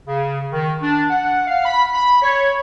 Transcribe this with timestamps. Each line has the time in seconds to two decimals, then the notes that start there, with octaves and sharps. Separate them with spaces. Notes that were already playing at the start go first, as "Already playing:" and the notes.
0.07 C#3
0.53 D#3
0.81 D4
1.10 F#5
1.47 F5
1.65 B5
1.93 B5
2.22 C#5